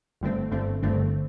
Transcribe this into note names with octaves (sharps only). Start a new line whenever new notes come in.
G1 G2 D3 A3 C4
G1 G2 D3 A3 C4
G1 G2 D3 A3 C4